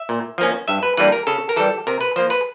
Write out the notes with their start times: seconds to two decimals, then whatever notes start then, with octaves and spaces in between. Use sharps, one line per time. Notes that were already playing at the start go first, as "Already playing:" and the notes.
Already playing: E5
0.09 A#2
0.38 F3 A#3 C#4
0.68 G2 E5
0.83 B4
0.97 E3 G3 A#3 D4 B4
1.12 A#4
1.27 C#3 A4
1.49 A#4
1.56 E3 G3 A4
1.87 C3 A#4
2.01 B4
2.16 F3 A#3 C5
2.30 B4